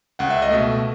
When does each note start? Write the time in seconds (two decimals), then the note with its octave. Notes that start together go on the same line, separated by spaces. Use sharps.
0.19 C#2 F#5
0.30 E5
0.42 D#5
0.51 B2 A3 E5